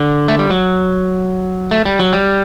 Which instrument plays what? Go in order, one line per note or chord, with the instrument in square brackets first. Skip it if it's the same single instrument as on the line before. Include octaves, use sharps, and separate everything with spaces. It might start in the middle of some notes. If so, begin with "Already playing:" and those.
Already playing: [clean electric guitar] D3
A3
G3
F#3
A3
G3
F#3
G3